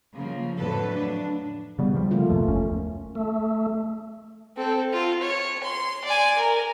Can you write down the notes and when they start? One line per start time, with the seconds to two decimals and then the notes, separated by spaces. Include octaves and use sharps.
0.14 C#3 F3 A#3
0.58 F2 A2 D3 F#3 A4 B4
0.95 D4
1.79 C#3 G3 B3
1.93 C#3 F3 G3
2.11 A3 A#3 F4
2.30 C#2 F#2 B2
2.45 F#1 D#2 C#4
3.15 A3
4.57 C4 A4
4.93 F4
5.21 C#5
5.63 C6
6.05 D5 G#5
6.38 A#4